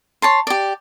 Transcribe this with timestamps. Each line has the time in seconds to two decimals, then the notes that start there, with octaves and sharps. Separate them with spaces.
0.22 C#5 A5 C6
0.47 G4 D5